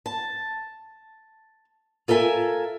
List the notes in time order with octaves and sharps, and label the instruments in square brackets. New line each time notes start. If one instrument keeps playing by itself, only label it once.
[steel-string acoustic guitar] A5
F4 A4 A#4 E5 G#5